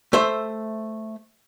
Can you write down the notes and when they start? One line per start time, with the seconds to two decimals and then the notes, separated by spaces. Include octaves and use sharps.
0.13 A3 C5 E5